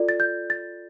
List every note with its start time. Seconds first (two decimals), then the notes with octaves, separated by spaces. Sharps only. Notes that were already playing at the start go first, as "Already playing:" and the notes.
Already playing: F4 A4 D5
0.09 A6
0.20 G6
0.50 A6